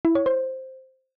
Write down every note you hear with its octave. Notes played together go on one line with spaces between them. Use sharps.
E4
C#5
C5